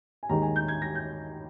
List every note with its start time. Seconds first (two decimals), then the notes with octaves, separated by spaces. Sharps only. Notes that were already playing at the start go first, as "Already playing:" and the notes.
0.23 G#5
0.29 D#2 D#3 G#3 A#5
0.42 G#5
0.56 G6
0.68 G#6
0.82 A#6
0.95 G6